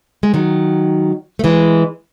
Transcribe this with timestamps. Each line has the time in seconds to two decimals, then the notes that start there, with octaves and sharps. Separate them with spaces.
0.23 G#3
0.34 D#3 F#3
1.39 A3
1.44 E3 G#3